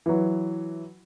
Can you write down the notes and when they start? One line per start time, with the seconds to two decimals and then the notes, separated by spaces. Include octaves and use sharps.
0.06 E3 F#3